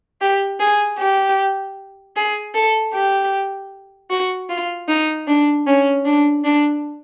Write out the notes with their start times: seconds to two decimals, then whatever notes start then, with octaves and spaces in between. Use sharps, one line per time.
0.21 G4
0.60 G#4
0.99 G4
2.16 G#4
2.55 A4
2.94 G4
4.11 F#4
4.50 F4
4.88 D#4
5.27 D4
5.67 C#4
6.05 D4
6.44 D4